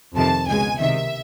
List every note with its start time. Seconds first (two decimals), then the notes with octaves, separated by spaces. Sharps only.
0.15 F2 C3 D#3 A5
0.47 C#2 B2 G#3 G#5
0.79 C2 C3 D#3 E5